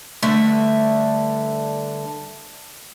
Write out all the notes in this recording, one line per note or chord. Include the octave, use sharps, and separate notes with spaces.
G2 D3 A3 E5